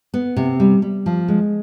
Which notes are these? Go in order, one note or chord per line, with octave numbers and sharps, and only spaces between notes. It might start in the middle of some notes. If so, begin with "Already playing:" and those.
B3
C3
G3
G3
F3
G#3